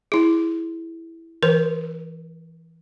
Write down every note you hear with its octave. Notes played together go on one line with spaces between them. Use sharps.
E4 G#4
E3 A#4 C5